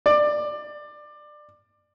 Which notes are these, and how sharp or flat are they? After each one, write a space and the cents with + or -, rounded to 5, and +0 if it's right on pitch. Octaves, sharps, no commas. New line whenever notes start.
D5 +20